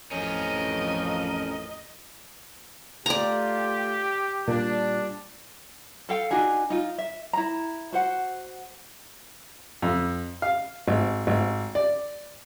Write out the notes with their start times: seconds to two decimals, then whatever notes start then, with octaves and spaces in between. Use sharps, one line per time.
0.12 A1 F2 F3 C#4 A#4 D#5
3.06 A3 F4 G4 D5 A#5
4.48 A#2 G3 D4
6.09 A4 F5 G5
6.31 D4 D#4 F#4 G#4
6.70 D#4 F4
6.98 E5
7.33 E4 A#5
7.93 F#4 C5 F#5
9.82 F2
10.42 F5
10.88 G#1
11.27 G#1
11.75 D5